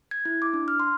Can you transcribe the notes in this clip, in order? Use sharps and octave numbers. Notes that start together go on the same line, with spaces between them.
G#6
E4
D6
D4
F6
C6